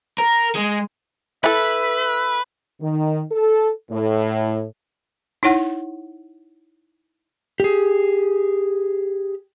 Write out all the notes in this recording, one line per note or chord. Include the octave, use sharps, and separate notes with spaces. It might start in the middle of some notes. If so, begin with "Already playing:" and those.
A#4
G#3
E4 A4 B4 E5
D#3
A4
A2
D#4 E4 C#5 F#5
G4 G#4